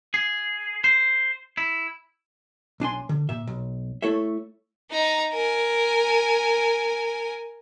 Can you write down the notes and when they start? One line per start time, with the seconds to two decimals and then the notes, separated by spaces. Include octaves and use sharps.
0.14 G#4
0.84 C5
1.57 E4
2.80 B1 D4 G#5 C6
3.09 D3
3.29 A#2 E5
3.47 B1
4.02 A3 E4 A4 C#5 E5
4.90 D#4 A#5
5.34 A#4 G#5